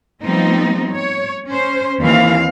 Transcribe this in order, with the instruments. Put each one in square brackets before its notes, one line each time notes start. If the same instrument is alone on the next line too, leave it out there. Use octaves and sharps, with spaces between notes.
[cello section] F3 G3 A3 B3 C4 D#4
C#5
C#4 C5
D#2 E3 C4 F5